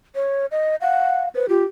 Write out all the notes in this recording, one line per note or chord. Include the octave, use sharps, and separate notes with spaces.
C#5
D#5
F5 F#5
B4 C5
F4 G4